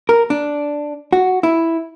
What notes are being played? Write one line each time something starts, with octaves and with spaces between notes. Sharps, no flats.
A#4
D4
F#4
E4